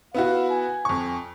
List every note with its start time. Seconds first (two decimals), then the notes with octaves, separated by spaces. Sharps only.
0.14 B3 E4 F#4 F5
0.50 G#5
0.85 F2 C#6